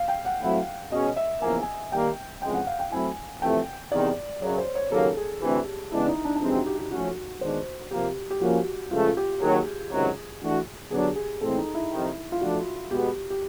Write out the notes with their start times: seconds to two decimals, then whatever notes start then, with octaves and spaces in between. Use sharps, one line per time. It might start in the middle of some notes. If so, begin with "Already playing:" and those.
Already playing: F5
0.08 G5
0.25 F#5
0.42 F#3 A3 C4 E4 F#5
0.91 B2 G#3 C#4 D#5
1.16 E5
1.41 E2 C#3 F3 A#3 G#5
1.62 G#5
1.92 D#3 G3 A#3 G5
2.42 F2 C#3 E3 G#3 G5
2.54 F#5
2.67 F5
2.79 G5
2.92 F#3 A3 C4 E4 G#5
3.42 F2 C3 E3 A3 G5
3.92 E2 C3 D#3 D5
4.41 F#2 C#3 F#3 C#5
4.58 C5
4.75 C#5
4.91 D#2 C#3 F#3 A#3 A4
5.17 G#4
5.42 D2 C3 E3 G4
5.92 C#3 E3 G#3 B3 D4 E4
6.08 D#4
6.25 D4
6.36 D4
6.41 F2 C3 E3 G#3 C4 D#4
6.55 F#4
6.67 G4
6.79 G4
6.91 F3 A3 C#4 F#4
7.41 D#3 G#3 B3 D4 C5
7.91 C3 F3 A#3 G4
8.30 G4
8.41 F3 A#3 C#4 F#4
8.91 C#2 C#3 F3 A3 F4
9.17 G4
9.41 D#2 D#3 F#3 G#4
9.91 C#2 C3 D#3 F#3
10.41 E3 A3 D4 F#4
10.91 D3 F#3 B3 D4 G#4
11.04 G4
11.16 G#4
11.41 A2 E3 G#3 C4 A4
11.58 D#4
11.75 E4
11.91 F2 C3 D#3
12.32 F4
12.41 F3 A3 D4 F#4
12.91 B2 G#3 B3 G4
13.30 G4